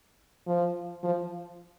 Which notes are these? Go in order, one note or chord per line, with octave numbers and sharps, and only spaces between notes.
F3
F3